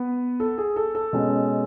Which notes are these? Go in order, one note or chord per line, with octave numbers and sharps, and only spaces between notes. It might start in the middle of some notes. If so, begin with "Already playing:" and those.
Already playing: B3 B4
A4
G#4
A4
A4
B2 G#3 C#4